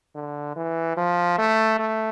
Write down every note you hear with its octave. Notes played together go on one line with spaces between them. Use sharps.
D3
E3
F3
A3
A3